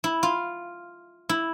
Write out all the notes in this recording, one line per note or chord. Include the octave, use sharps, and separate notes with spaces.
E4
F4
E4